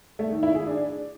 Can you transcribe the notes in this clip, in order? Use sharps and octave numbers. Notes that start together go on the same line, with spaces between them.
A3
D#3
E4
G#4
D4